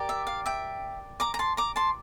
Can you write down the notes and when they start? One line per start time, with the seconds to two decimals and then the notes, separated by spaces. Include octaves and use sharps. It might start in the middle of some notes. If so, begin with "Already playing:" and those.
Already playing: G4 A#4 D5
0.09 E5
0.27 F5
0.46 E5 G5
1.20 A#5 D6
1.34 A#5
1.39 A5 C6
1.57 A#5 D6
1.76 A5 C6